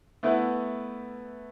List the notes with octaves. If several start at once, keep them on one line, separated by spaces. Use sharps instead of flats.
A3 B3 E4 B4